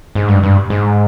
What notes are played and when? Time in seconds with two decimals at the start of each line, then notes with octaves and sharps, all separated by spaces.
0.15 G#2
0.28 G2
0.43 G2
0.70 G#2